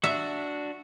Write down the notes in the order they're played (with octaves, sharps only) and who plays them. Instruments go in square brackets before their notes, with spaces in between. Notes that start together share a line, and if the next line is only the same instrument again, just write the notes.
[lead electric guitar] D4 F#4 [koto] E5